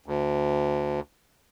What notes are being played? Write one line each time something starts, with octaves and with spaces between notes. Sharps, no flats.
D2